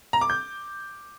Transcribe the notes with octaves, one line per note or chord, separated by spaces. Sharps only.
A#5
D6
G6